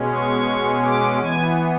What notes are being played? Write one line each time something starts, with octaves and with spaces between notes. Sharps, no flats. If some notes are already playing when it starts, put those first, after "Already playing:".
Already playing: B2 G#3 C#4
C#6
D6
E3 B3 G#5